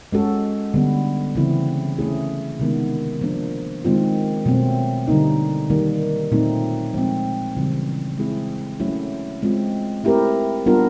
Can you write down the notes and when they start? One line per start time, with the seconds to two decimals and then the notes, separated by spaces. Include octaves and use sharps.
0.12 G#3 C#4 F#4 A4
0.74 D3 G3 B3
1.35 C#3 E3 A3 C4 E4
1.99 A3 C#4 E4 G#4
2.59 C3 D#3 G#3 B3
3.21 F3 A#3 D4
3.85 D#3 G#3 C4 F4
4.45 B2 F#3 A3 C4
5.08 D3 G3 A#3 D#4
5.70 D#3 G3 A#3
6.31 A#2 F#3 A3 C4 D#4
6.94 F3 G#3 C4
7.57 C#3 E3 G3 C4
8.18 G#3 C4 E4 G#4
8.80 F#3 A3 C#4 E4
9.42 G#3 C4 F4
10.04 A3 C4 E4 G4 A#4
10.66 G3 B3 D4 F4 A#4